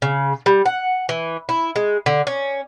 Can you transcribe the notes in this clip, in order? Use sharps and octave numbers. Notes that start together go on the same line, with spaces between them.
C#3
G3
F#5
E3
E4
G#3
D3
C#4